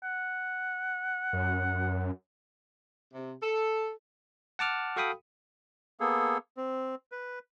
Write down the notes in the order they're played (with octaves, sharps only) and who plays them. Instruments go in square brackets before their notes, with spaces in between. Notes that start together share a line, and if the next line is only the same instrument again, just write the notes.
[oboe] F#5
[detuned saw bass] F#2
[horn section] C3
A4
[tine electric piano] F#5 A5 D6 F6
F#4 A4 F5 G5 B5 D#6
[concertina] A#3 B3 G#4 A4
C4
B4